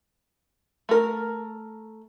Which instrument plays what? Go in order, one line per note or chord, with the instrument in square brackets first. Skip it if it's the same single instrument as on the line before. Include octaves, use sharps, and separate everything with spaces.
[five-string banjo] A3 A#4